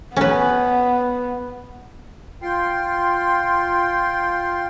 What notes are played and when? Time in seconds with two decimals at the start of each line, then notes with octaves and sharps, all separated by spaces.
0.17 B3 C#4 B4
2.42 F4 G5 C6